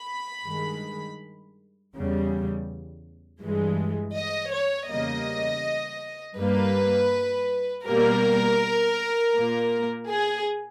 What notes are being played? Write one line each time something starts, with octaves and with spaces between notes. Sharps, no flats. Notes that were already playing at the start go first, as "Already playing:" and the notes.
Already playing: B5
G2 D#3 G#3
E2 C#3 G3
G2 E3 G#3
D#5
C#5
E2 C#3 G3 A#3 D#5
G2 G3 A#3 B4
B2 G3 A#3 A#4
A#2 A#3
G#4